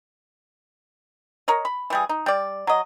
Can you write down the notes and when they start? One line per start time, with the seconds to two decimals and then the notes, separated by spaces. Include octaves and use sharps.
1.48 A#4 C#5 D#5
1.65 B5
1.90 E3 G3 G#4
2.09 D#4
2.26 G3 D5
2.67 F#3 D#5